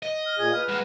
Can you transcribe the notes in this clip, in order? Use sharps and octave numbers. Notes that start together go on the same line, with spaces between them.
D#5
F6
A#2 G#4 G#6
B4 F6
G#3 F#4